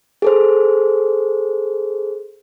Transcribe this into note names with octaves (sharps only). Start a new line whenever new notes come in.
G#4 A4 C5